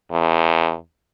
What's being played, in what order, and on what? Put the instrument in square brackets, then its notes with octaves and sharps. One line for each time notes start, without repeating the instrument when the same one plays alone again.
[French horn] E2